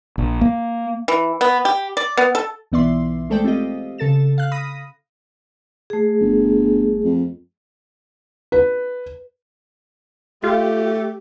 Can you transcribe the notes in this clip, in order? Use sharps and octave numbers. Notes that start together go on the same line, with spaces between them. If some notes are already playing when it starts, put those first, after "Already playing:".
A#1
A#3
E3
B3
G4
D5
B3
A4
B1 E3 B3 D5 E5 C6
G#3 A3 A4 C5 D5 G5
C4 F4 G4 D#5
C#3 A4 A6 E7
F5 F#6
B5 D#6 A#6
A3 G#4
G1
F2
B4
A3 F4 G4